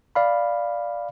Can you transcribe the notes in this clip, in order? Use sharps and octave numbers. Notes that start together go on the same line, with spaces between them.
D5 F5 B5